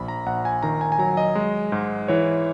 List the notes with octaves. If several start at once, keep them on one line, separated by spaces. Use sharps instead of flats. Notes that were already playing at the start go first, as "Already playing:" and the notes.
Already playing: A#1 B5
A#5
A#1 F#5
G#5
D#3 A#5
G#5
G#5
F#3 A#5
D#5
G#3
G#2
E3 C#5